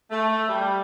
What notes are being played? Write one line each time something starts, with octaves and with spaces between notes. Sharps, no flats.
A3
G3